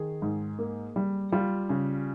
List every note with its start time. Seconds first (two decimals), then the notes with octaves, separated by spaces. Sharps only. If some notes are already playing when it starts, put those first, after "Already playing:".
Already playing: D#3 G#4
0.22 G#2
0.59 A#3
0.96 G3
1.32 G3 F4
1.69 C#3